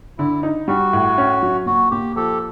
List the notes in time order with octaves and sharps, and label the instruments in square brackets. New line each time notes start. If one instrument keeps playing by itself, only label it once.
[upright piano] D3 [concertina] E4
[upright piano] D#4
[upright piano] G3 [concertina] F#4
[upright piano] A2
C#4
F#3
[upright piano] A#2 [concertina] F#4
[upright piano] A#2 [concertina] G4
[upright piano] F3 [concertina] G4 A4